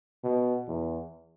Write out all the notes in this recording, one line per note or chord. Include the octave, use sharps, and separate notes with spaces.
B2
E2